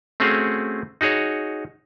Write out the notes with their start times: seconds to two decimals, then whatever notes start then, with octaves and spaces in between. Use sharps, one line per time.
0.20 A3 C4 C#4 F#4 G#4 F5
1.01 D#4 F#4 G#4 C#5